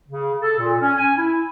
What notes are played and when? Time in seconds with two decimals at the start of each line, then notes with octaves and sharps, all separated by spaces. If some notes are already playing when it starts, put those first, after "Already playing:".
0.09 C#3
0.41 A4
0.59 A#2
0.81 C#4
0.98 G#5
1.17 E4